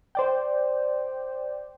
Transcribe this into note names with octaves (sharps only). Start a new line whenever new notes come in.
C5 D5 G5